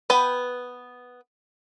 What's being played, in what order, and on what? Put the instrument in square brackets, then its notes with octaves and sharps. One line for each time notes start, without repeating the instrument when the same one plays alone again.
[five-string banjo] B3 B4 G5 B5